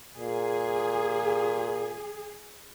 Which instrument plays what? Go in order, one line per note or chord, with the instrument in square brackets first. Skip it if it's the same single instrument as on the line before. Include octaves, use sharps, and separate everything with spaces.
[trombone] A#2 [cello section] G#4